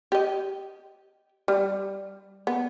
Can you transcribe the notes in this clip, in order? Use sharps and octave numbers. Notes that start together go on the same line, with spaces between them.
G4 D#5
G3
B3